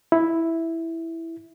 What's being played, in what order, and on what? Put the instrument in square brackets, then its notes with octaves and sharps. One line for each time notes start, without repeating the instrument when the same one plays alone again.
[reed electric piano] E4